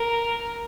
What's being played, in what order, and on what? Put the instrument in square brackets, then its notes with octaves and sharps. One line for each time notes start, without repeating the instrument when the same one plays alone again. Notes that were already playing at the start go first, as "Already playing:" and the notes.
Already playing: [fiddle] A#4